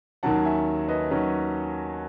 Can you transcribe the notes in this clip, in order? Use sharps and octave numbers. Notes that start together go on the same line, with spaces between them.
D#2 D#3 F#3 C#4 F#5 A5
E5 G#5
B4 D#5
D#3 F#3 C#4